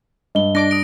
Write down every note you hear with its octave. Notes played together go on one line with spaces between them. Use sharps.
G2 D#5 G7
D4 D6 A#6
D#6 D7 G7